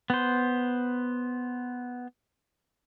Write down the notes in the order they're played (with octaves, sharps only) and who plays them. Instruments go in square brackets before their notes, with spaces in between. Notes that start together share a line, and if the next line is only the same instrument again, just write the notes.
[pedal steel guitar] B3 C5